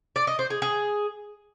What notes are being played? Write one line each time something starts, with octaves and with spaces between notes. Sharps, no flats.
D5
D#5
C5
G#4
G#4